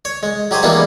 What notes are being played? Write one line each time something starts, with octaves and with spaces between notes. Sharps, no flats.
C#5
G#3
F#3 G4 G#4 C5
E3 G3 G#3 A#3 B3 D4